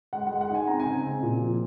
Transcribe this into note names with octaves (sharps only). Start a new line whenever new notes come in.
G#3 F#5
F#5
G#3
F#5
D#4 G#5
C4 A#5
G#5
C#3
C4
A#2
F3